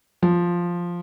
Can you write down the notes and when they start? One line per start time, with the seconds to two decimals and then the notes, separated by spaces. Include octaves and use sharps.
0.23 F3